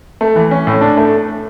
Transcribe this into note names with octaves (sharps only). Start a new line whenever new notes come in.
A3
E3
C#4
A2
D4
A3